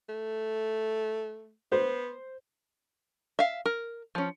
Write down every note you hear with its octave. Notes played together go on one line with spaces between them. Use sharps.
A3
B3 C5
E5 F5
A#4
F3 C#4